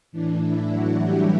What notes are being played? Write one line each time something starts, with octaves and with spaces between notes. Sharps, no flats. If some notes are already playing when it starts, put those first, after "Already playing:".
A2 E3 D4
E4
F#3 F#4
G3 G4